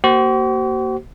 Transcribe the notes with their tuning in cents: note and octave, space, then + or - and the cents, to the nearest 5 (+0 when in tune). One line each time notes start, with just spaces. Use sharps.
A#3 +0 F#4 +45 C5 +0